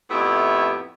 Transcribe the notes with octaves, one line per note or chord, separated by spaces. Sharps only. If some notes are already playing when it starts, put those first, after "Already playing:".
F2 A2 B3 E4 G4 E5